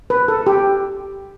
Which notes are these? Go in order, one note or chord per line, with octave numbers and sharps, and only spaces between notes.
B4
A4
G4